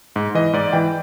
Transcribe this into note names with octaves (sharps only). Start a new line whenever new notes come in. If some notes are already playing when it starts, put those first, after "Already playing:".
G#2
E3 D#5
G#2 D5
E3 G5